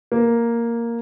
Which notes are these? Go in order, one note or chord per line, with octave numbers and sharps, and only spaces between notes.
A#3